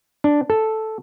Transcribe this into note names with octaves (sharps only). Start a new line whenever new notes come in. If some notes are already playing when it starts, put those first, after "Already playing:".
D4
A4